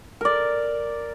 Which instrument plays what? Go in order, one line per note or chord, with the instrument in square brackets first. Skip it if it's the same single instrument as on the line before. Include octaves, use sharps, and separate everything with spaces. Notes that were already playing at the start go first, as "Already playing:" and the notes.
[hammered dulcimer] A#4 D5